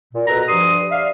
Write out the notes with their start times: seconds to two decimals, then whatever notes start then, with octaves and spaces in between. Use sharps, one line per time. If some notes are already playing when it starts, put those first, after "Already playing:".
0.13 A#2
0.27 B2 A4 B4 A#5
0.48 G2 F3 C6 D#6
0.91 D5 E5 F5